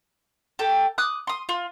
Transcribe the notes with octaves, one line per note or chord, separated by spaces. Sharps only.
G4 A4 G5
D6 D#6 F#6
C6 D#6
F4